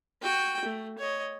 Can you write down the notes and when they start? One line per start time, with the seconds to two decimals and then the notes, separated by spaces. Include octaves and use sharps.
0.22 F#4 G5
0.65 A3
0.98 C#5 D#5